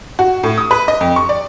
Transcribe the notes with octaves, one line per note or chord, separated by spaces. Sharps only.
F#4
A2
D#6
B4
D#5
F2
C#6
D5